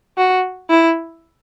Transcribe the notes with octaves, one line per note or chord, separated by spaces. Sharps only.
F#4
E4